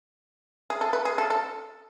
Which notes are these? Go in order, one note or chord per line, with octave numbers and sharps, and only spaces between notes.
G#4
A4
B4
G#4
A4
A4